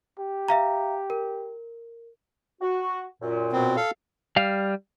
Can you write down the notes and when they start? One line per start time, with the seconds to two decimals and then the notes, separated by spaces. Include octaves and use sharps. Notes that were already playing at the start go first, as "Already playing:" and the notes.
0.19 G4
0.48 E5 F5 A#5
1.10 A#4
2.61 F#4
3.22 F#2 A#2
3.52 B2 C4
3.76 A4 F5
4.36 G3 F5